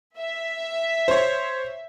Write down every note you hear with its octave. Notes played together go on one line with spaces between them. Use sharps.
E5
C5 C#5